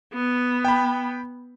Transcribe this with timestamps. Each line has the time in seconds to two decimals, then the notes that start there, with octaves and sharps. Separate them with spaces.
0.13 B3
0.65 G5 B5